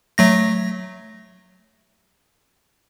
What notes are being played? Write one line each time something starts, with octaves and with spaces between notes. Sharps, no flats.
F#3 A3 A#6